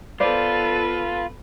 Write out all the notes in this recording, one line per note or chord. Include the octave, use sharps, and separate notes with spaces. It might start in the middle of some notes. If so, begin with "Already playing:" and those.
B3 F4 A4 B4 C5 D5